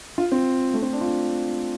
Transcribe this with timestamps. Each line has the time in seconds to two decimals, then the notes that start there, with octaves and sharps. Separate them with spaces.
0.18 F4
0.32 C4
0.74 A3
0.82 C4
0.93 D4
1.01 F4